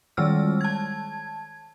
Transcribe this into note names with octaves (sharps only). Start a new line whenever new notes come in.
D#3 G3 G#3 E6 F6
A5 G#6